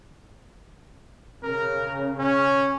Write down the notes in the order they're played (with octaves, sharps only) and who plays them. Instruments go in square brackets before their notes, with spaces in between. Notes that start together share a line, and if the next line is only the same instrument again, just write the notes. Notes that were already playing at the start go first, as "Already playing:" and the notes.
[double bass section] C#3 [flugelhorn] A#4
[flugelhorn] C#4